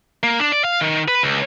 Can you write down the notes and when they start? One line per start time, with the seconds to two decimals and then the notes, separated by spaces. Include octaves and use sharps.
0.23 A#3
0.40 D4
0.52 D5
0.64 F5
0.81 D#3
1.08 B4
1.23 C#2